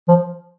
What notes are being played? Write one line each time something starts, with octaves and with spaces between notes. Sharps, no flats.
F3